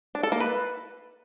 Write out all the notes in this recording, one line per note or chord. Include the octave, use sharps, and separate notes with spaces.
D4
A4
A#3
B4